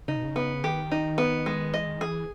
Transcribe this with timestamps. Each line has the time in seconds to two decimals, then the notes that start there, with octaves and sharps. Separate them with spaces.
0.08 C#3 D#4
0.16 B2
0.24 C#3
0.36 B3
0.64 D#3 G4
0.91 D#4
1.18 B3
1.46 G#3
1.74 E3 D#5
1.87 D#3
1.98 E3 G#4